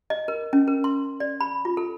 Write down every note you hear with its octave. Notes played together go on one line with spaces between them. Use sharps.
D#5
A#4
C#4
A#4
C6
D5
B5
F4
A4